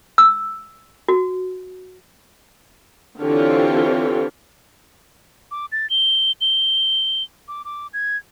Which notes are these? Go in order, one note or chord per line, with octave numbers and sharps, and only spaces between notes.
E6
F#4
D3 E3 C4 F4 G4 C#5
D6
A6
G7
G7
D6
D6
G#6